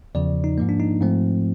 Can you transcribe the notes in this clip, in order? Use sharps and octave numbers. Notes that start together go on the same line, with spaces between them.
E2 C#3 F3 D5
D#4
G#2 F3 A#3
D4
D#4
G#2 F3 A3 C4